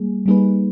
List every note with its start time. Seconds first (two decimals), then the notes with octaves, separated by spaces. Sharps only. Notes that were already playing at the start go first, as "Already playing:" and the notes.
Already playing: G3 A#3 G#4
0.26 G3 A#3 D#4 G#4 B4